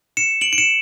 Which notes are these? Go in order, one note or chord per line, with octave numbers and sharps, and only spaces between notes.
C#7 E7
D7 F#7
D7
C#7 E7